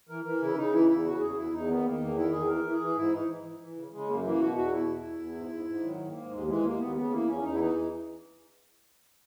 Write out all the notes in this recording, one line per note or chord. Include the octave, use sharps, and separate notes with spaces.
E3 A#4
E3 A#4
C#3 E4
C#3 D#4
E3 E4
E2 E4
C#3 F#4
E2 G#4
E2 E4
E2 D#4
D#3 B3
D#3 A#3
E2 A#3
D#3 E4
E2 G#4
E3 A#4
E3
G#4
E3
G#2 E4
E3 D#4
E3
E3
E3
C#3
C#3 G#3
F#2 A#3
E3 A#3
B2 F#4
E2 F#4
B2 E4
E2
E2
E2
G#2
G#2
G#2
D#3 F#3
G#2
A#3
G#2
D#2 G#3
E3 G#3
D#2 A#3
D#2 B3
C#3 B3
E3 A#3
E2 C#4
E2 D#4
E4
E3 D#4